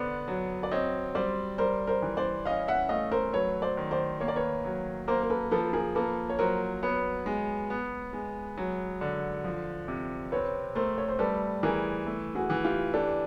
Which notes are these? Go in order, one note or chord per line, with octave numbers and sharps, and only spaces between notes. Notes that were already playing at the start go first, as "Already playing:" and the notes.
Already playing: D3 B3 C5 D5
F#3
D5
C4 C#5 D#5
G3 C5 D5
G3 A#4 C5
A#4 C5
E3
C5 D5
C#4 D#5 F5
E5 F#5
A3 D#5 F5
A#4 C5
F#3 B4 C#5
C5 D5
D#3
C5 D5
A#3 C#5
D5
B4 C#5
F#3
A#3 A#4 C5
A#4
A4 B4
F3 A4 B4
G#4 A#4
A#3 A4 B4
C#5
F#3 A#4 C5
B3 B4 C#5
G#3
B3
G#3
F#3
D3
F3
C3
C4 B4 C#5
A3 A#4 C5
C#5
C5
G3 A4 B4
E3 G#4 A#4
A3
F#4 G#4
E3
F4 G4
D4 G4 A4